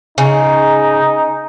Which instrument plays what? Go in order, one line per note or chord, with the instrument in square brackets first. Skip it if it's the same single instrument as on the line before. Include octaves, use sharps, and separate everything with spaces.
[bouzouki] C#3 [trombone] D#4